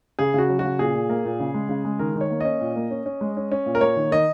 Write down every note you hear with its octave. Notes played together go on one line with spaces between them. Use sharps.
C#3 G#4
C#3 F#4
F#3
F#4
C#3
A#2 G#4
A#2
A#3
A#2
C#3
G#3
C#3
G#3
D#3 A#4
D#3
C#5
A#3
C#4 D#5
A#2
A#3
C#4
C#4
G#3
C#4
C#4
A#2
A#4
A#3 C#5
D#3
D#3 D#5